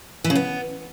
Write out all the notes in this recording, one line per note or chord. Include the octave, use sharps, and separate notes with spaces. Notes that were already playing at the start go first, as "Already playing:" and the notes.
E3
C#3
B3